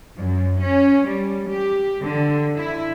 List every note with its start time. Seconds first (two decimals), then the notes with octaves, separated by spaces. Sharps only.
0.20 F#2
0.61 C#4
1.08 G3
1.51 G4
2.03 D3
2.57 E4